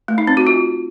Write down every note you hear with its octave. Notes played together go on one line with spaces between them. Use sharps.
A3
D#4
C4
F#4
F4